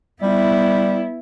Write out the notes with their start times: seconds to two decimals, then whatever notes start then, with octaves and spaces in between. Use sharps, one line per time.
0.22 G3 B3 E4